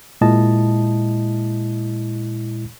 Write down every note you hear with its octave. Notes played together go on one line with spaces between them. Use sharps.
A#2 G#3 E4 D#5 A5